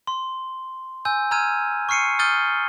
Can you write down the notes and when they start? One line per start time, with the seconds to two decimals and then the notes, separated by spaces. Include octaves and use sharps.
0.07 C6
1.05 G#5 E6 G6
1.31 A#5 E6 F6 G#6 D#7
1.89 C#6 F6 C7 C#7 D#7
2.19 D#6 F6 G6 A6 D#7 G7